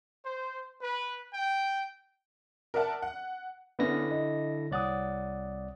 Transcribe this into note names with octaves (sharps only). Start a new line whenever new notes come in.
C5
B4
G5
A#4 D5 E5 F#5 A5
F#5
D3 B3 C#4 E4 A#6
D#5
C2 C#5 D5 F#5 D#6